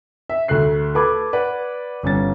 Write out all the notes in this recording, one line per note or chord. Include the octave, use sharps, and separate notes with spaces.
E5
D2 A3 F#6 C7
A4 B4 A5 B5 D6 G#6
B4 D5 F#5
G1 C#4 A6